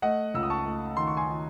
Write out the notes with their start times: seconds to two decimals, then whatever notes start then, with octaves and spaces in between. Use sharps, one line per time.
0.02 A3 D#5 F#5
0.34 C#2 E6
0.43 D#6
0.50 A5 C#6
0.66 A3
0.97 D#3 C6
1.07 C#6
1.17 G#5 C6
1.28 D#3